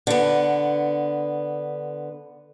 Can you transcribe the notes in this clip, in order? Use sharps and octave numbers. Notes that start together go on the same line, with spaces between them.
D3 B3